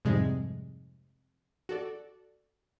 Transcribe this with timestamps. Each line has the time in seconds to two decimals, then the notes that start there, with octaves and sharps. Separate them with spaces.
0.05 F2 G#2 C3 G3 G#3
1.69 F#4 A4 D5